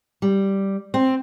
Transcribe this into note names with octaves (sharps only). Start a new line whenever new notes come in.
G3
C4